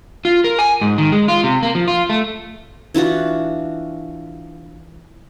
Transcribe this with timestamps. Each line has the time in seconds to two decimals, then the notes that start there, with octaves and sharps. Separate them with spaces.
0.25 F4
0.44 A#4
0.59 G#5
0.81 G#2
0.98 D#3
1.12 G#3
1.28 F4
1.44 C3
1.63 A#3
1.75 F3
1.88 F4
2.09 A3
2.94 E3 D4 F4 F#4